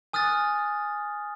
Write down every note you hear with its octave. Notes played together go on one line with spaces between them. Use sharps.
G#5 D#6 F6 F#6 A6